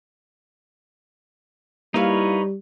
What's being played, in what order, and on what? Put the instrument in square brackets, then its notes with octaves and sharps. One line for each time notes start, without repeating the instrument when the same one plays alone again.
[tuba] G3 [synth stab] A#3 E4 F5 [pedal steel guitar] D#4 B4 C#5